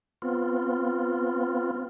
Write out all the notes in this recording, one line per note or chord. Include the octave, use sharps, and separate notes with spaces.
B3 C4 F4